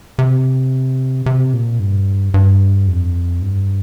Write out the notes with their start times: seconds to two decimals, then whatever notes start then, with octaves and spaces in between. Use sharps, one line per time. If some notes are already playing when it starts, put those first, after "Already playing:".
0.19 C3
1.26 C3
1.53 A#2
1.80 G2
2.34 G2
2.87 F2
3.41 G2